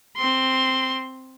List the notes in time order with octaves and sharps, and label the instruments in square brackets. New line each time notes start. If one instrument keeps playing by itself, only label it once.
[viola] C4 C6